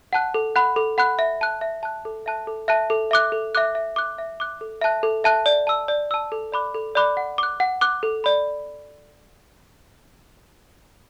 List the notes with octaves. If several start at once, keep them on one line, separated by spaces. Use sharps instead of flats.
F#5 A5 F#6
A4
F#5 B5 F#6
A4
F#5 B5 F#6
E5
A5 F#6
E5
A5 F#6
A4
E5 A5 F#6
A4
E5 A5 F#6
A4
E5 D6 F#6
A4
E5 D6 F#6
E5
D6 F#6
E5
D6 F#6
A4
E5 A5 F#6
A4
E5 A5 F#6
D5
A5 E6
D5
A5 E6
A4
D5 B5 D6 F#6
A4
D5 B5 D6 F#6
F#5
D6 F#6
F#5
D6 F#6
A4
D5 B5